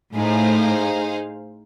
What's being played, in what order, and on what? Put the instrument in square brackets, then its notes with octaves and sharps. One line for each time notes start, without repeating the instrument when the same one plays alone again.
[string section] A2 [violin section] D#4 G#4 C5 F5